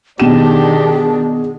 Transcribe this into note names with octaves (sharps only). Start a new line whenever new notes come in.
B2 D#3 D4 G4 G#4 E7